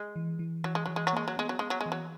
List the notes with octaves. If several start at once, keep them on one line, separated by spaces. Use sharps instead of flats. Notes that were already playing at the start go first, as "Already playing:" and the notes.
Already playing: G#3
E3
E3
E3 F#3
G#3
E3 F#3
G#3
F#3
G#3 A#3
F#3
G#3 B3
F#3
G#3 B3
F#3
G#3
E3
F#3